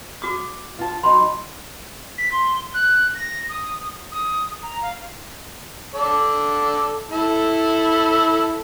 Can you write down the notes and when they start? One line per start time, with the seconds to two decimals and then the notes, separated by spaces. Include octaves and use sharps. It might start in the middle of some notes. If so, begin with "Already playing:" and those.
0.22 F#4 D6 D#6
0.79 F4 A5
1.03 F#3 D#4 B5 C6
2.18 B6
2.31 C6
2.74 F#6
3.15 A#6
3.49 D#6
4.11 D#6
4.62 A#5
4.82 F5
5.95 A4 D5
7.11 E4 A4